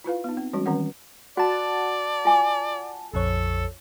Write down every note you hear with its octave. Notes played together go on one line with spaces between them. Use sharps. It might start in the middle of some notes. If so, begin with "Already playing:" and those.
E4 F4 B4 F5
B3 D#4
C4
E3 G3 G#3 C#4 F#4
D#3 E3 G3 C4 C#4 F#5
F#4 D5 F#5 A5
F4 G#5 D6
A#1 F2 A4 C#5